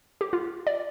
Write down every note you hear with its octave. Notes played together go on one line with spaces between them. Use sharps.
G4
F4
D5